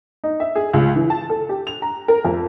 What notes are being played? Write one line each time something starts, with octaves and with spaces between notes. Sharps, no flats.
D#4
E5
G#4
C#2
E3
A5
A4
G4
F7
A#5
A#4
F2